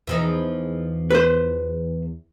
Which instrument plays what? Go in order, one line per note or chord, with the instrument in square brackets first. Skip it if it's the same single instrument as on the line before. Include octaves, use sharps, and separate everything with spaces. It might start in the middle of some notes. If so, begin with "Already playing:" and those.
[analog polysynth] E2 [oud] E3 F3 D#4
[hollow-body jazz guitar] B4 C5